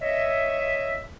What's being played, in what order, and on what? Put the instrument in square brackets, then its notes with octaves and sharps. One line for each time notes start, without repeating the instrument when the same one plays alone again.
[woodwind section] C#5 D#5 E5